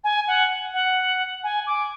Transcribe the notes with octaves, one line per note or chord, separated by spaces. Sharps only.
G#5
F#5
F#5
G#5
D6